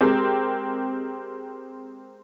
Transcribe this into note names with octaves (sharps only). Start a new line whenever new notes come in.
G#3 C4 G4 A#4